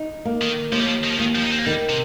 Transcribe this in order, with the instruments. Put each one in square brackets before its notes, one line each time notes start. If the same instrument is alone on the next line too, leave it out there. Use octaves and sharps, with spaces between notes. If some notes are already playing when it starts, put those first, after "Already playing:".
Already playing: [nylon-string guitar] D#4
A#3
[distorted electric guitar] D#3
[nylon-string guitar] D#2 [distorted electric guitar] F3
[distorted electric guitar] G3
F3
D#3
F3
[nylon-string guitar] D#2 [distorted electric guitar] D#3
[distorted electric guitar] F3
D#4
C4
A#3
[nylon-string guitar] D#3 [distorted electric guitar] G3
[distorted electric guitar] C3